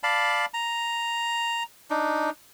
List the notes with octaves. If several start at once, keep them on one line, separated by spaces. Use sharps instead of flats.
D5 F5 A5 B5
A#5
D4 D#4